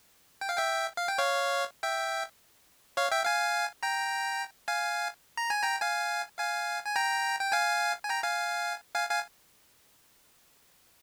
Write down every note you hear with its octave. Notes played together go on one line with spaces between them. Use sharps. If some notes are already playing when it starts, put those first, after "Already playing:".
G5
F5
E5 G5
F5
G5
C#5 F5
E5 G5
C#5 F5
E5 G5
F5 G#5
G5 A#5
F5 G#5
A#5
G#5
G5 A#5
F5 G#5
F5 G#5
G#5
G5 A#5
G5
F5 G#5
G#5
G5 A#5
F5 G#5
F5 G#5
F5 G#5